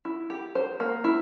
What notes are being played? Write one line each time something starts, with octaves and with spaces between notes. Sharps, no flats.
E4
G4
C5
A#3
E4